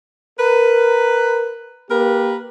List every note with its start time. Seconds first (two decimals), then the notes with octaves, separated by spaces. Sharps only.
0.39 A#4 B4
1.90 A#3 G4 A#4 B4